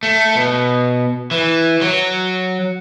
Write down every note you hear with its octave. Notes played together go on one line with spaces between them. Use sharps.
A3
B2
E3
F#3